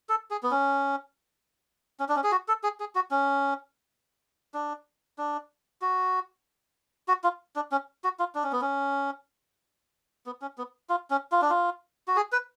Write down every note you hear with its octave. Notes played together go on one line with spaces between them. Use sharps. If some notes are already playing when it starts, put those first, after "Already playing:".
A4
G#4
B3
C#4
C#4
D4
C#4
G#4
F#4
A4
G#4
G#4
F#4
C#4
D4
D4
F#4
F#4
F4
D4
C#4
F#4
F4
D4
C#4
B3
C#4
B3
C#4
B3
F4
C#4
F4
D4
F4
F#4
G#4
B4